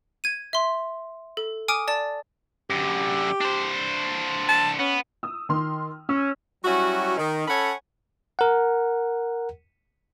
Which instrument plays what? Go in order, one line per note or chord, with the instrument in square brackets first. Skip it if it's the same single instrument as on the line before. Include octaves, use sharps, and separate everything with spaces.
[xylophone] G#6 D#7
E5 C6
A4
G#5 D6 D#6 F6 D7
D5 A5 A6
[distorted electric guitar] F#2 D3 [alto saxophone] G4
[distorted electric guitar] D4 C5
[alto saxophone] A5
[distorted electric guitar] B3 [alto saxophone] C#4
[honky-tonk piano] D#6 E6
D#3 C6 F6
[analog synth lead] C#4 [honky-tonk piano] E6
[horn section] F#3 G3 C#4 E4 F#4
D#3
C#4 A4 C#5 F#5 G#5 B5
[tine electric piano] A#4 F#5